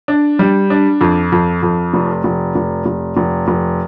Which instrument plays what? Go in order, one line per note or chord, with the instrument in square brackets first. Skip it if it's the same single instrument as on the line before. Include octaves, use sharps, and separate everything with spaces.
[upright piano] D4
G3
D4
F2
F2
F2
F1
F1
F1
F1
F1
F1